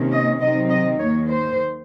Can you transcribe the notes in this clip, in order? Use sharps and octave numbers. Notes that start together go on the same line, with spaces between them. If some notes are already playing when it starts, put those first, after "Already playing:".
Already playing: C3 D#3 A#3 C#4
D#5
C3 D#3 F#3 C4 D#4 D#5
D#5
D#2 D#3 A#3 C#5
C5